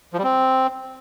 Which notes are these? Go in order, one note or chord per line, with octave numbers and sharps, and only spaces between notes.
F3
G3
C4